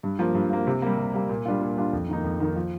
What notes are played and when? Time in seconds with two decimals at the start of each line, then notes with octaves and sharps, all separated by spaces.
0.03 G2
0.19 F3 A#3
0.35 G2
0.50 F3 A#3
0.67 C3
0.82 G3 A#3
0.98 C3
1.14 G3 A#3
1.29 A#2
1.46 G3 D4 F4
1.61 A#2
1.77 G3 D4 F4
1.93 F2
2.09 D#3 A#3 D#4
2.24 F2
2.40 D#3 A#3 D#4
2.56 F3